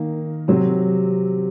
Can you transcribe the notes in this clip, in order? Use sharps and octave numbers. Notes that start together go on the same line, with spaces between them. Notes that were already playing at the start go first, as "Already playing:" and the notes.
Already playing: D#3 A#3
C3 F#3 C4